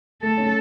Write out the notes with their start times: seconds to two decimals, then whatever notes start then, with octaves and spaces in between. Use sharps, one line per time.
0.23 A3 A4
0.37 C#4